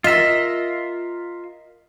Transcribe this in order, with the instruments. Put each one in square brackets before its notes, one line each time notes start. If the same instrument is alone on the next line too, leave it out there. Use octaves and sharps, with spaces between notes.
[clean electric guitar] F4 E5 [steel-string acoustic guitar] A#4 D#5